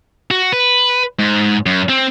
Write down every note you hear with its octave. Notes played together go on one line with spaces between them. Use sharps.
F#4
B4
G#2
F#2
C4